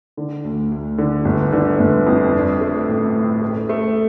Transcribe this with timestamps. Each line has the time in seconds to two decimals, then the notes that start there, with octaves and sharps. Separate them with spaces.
0.17 D3
0.44 D2
0.72 D2
0.98 D3
1.25 G1
1.53 D3
1.79 G1
2.06 F2
2.34 D4
2.61 A3
2.88 A1
3.15 A2
3.41 A3
3.69 A3